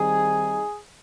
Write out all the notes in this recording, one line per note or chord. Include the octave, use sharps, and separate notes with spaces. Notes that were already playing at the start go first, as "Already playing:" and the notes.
Already playing: D#3 G3 C4 D#4 G#4